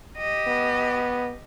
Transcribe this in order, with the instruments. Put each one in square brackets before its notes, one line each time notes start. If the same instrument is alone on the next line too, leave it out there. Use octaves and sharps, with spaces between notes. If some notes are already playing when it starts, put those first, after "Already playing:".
[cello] G4 D#5
[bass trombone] B3